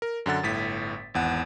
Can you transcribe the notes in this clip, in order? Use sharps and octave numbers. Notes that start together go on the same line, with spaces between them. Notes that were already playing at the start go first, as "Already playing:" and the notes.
A#4
F#2 D3 F#5 A6
G1 A2 B6
G#1 E2 F#5